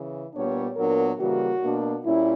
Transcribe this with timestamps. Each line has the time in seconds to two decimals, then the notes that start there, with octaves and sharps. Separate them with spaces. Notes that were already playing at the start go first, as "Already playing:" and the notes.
Already playing: C#3 E3
0.34 A#2 G3 B3 D4 C#5
0.76 A#2 F#3 B3 D4 A#4
1.19 C#3 E3 G3 A#3 F#4
1.61 B2 A#3 D4
2.04 A#2 G3 C#4 E4